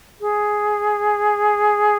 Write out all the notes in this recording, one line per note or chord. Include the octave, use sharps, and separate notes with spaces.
G#4